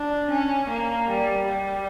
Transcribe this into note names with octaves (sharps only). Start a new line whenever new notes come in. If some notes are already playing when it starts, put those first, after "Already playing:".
Already playing: D4
C#4
A#3
G3
G3